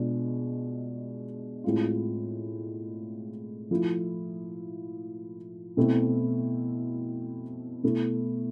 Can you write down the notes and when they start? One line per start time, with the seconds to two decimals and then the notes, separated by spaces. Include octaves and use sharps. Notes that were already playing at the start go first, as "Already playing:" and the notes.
Already playing: B2 G#3 D4 F4
1.64 A2 G#3 C4 F4
3.71 F3 A3 E4
5.77 B2 A3 C4 E4
7.83 B2 A3 E4